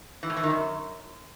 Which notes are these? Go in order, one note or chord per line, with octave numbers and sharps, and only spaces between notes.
E3
A2
E3
D#3
F#2